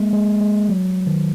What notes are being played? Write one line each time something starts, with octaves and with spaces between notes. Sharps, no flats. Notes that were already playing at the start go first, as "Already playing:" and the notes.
Already playing: G#3 A#3
G#3
G#3
F#3
D#3